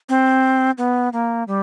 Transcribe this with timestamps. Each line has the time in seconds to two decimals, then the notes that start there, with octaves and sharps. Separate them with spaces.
0.09 C4
0.78 B3
1.13 A#3
1.48 G3